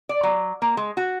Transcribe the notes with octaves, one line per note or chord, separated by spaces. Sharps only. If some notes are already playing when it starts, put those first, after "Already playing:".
D5
F#3
A#3
G#3
F#4